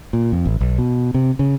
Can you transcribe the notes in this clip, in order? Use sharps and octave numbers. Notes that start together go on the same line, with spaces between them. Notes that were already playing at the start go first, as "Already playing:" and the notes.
A#2
F2
A1
B1
B2
C3
C#3